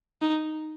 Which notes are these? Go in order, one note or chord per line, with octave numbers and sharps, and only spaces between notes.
D#4